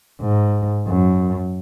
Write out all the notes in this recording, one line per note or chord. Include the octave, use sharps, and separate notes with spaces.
G#2
F#2